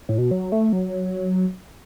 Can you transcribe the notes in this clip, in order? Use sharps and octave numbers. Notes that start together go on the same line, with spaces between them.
A2
B2
F#3
A3
F#3